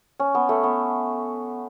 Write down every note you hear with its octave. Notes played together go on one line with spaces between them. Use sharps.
C#4
B3
A3
B3